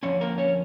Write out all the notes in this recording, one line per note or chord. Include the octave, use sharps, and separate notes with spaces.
F2 D3 F3 C#4 C#5
A#3 A#4
C#4 C#5